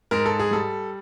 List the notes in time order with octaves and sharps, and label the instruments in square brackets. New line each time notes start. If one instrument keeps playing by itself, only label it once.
[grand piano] G#2 A#4
A4
G#4
G3 A4